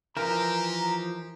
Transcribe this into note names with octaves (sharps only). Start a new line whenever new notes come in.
E3 F3 G4 A#4 A#5